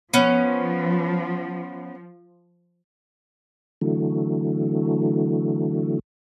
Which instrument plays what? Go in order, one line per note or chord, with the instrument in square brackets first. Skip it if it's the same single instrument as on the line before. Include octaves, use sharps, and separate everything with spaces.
[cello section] F3 [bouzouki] B3 C#4
[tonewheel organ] D3 E3 F#3 A3